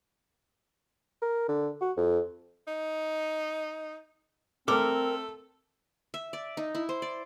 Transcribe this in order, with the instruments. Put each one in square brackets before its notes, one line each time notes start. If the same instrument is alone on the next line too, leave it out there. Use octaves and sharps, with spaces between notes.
[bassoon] A#4
D3
F#4
F2
[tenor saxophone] D#4
[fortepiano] A3 D6 [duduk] C4 [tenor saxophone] A4 [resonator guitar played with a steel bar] A#4
[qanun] E5
D5
D#4
E4
C5
D5